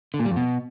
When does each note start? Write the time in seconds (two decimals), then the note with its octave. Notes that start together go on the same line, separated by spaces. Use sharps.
0.14 D3
0.19 A#2
0.25 G3
0.31 F2
0.36 B2